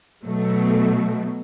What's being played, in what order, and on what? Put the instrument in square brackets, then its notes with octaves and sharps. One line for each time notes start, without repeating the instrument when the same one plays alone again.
[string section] B2 F#3 A3